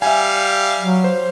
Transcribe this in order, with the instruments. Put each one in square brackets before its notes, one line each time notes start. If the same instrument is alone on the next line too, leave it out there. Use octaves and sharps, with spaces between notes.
[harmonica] G3 F5 [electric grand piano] E5 G#5
[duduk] F#3
[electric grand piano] C5